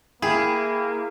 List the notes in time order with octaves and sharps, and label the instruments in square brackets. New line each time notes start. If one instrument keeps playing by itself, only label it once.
[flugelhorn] A#3 [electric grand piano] E4 G5 [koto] G#4